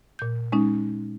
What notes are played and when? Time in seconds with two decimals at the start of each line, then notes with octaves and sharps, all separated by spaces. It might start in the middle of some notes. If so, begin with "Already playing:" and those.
0.19 A#2 G6
0.52 G#3 C#4 D#4